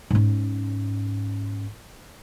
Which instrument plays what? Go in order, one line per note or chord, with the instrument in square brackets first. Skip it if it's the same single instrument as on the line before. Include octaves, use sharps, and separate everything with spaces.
[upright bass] G#2 C#4